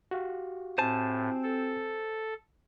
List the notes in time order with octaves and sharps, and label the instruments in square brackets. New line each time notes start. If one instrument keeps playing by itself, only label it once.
[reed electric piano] F#4 G4 F5
[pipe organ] A2 [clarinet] C4 [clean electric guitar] C5 G#5 A5
[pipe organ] A4